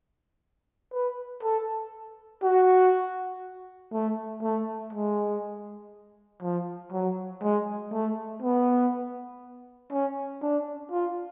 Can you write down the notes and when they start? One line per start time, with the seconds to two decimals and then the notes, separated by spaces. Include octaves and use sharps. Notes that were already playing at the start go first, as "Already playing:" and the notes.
0.93 B4
1.43 A4
2.43 F#4
3.93 A3
4.42 A3
4.93 G#3
6.42 F3
6.92 F#3
7.42 G#3
7.93 A3
8.42 B3
9.92 C#4
10.42 D4
10.91 F4